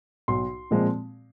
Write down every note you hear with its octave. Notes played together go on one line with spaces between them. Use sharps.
B1 C6
A#2 F3 G#3 C4